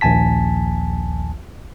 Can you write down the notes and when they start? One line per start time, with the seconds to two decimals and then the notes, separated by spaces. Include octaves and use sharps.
0.01 A#1 D#2 G#5 A5 B6